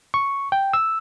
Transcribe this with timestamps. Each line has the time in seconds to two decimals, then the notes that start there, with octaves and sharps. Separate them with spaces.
0.14 C#6
0.52 G5
0.73 E6